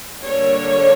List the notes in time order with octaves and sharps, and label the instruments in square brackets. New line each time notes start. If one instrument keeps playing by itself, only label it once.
[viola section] D3 G3 A#3 D4 C#5